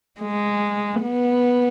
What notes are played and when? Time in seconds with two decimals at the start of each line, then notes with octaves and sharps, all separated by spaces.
0.21 G#3
1.02 B3